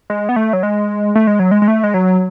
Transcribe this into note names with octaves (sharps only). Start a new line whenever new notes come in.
G#3
B3
A3
F#3
G#3
A3
G#3
F#3
G#3
G#3
A3
G#3
F#3